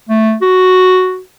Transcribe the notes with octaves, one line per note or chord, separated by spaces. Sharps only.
A3
F#4